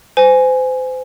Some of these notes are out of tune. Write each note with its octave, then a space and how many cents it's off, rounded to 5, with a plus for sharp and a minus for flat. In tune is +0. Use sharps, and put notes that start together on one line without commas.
C5 -35 G#5 +0